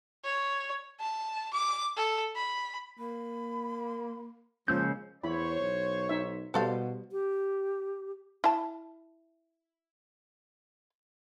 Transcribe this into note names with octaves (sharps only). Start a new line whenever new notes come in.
C#5
A5
D6
A4
B5
A#3 B5
C#3 F3 G#3 A#3 C#4 C#5 E6 G6
E2 E4 C5 C#5 B5
B1
D#4 E5
B2 G3 F#4 A4 C5 F5
G4
E4 A5